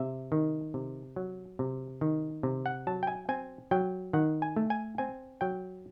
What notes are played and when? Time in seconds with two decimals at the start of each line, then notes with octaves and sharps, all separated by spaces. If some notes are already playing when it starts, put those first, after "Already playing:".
Already playing: C3 E5
0.32 D#3
0.74 C3
1.16 F#3
1.59 C3
2.01 D#3
2.43 C3
2.66 F#5
2.87 F#3 A5
3.03 G5
3.07 G#5
3.29 C4 G#5
3.71 F#3 G5
4.13 D#3 F#5
4.42 G#5
4.56 A3
4.70 G#5
4.98 C4 G#5
5.41 F#3 G5